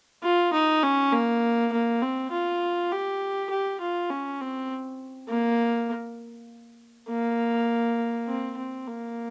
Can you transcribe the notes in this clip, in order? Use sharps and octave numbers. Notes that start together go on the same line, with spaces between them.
F4
D#4
C#4
A#3
A#3
C4
F4
G4
G4
F4
C#4
C4
A#3
A#3
C4
C4
A#3